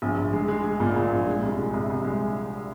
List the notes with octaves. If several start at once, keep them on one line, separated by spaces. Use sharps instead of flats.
A#1
A#1
G#3
G#3
G#3
A#2
A#2
A#1
G#3
C2
G#3
C2
C2
G#3